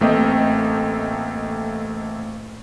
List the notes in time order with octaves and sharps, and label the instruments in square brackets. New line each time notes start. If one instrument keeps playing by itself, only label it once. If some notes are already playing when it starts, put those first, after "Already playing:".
[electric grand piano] A1 A3 A#3 C4 D#5 G5